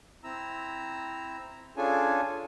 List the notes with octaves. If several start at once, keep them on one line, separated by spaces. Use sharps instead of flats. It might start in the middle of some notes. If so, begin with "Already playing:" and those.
C4 E4 A#5 E6
C#4 D4 F4 G#4 A4 G#5